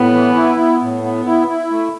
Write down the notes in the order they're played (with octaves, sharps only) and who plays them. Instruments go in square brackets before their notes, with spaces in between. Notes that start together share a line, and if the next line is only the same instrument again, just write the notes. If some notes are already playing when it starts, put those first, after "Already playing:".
Already playing: [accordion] A2 [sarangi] B3
[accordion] E3
E4
B3
A2
B3
E4
E4
A3